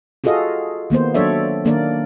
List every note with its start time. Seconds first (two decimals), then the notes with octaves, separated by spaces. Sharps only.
0.24 F4 F#4 G#4 A4 D#5 F5
0.90 D#3 A#3 B3 C5
1.14 F#3 D4 A4 C#5 D5 E5
1.65 D#3 A#3 D4 A#4 D5